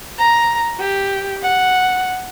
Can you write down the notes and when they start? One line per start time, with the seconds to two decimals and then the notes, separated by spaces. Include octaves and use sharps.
0.18 A#5
0.80 G4
1.42 F#5